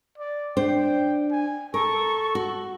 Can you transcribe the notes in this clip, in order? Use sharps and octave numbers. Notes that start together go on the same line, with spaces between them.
D5
D4 C5 G5
G#5
A4 A#4 C#6
F#4